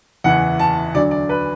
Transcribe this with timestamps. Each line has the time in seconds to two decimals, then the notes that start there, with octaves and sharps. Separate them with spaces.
0.24 F#1 E2 E3 F#5
0.59 A5
0.94 D2 D3 F#3 D5
1.11 D5
1.29 B4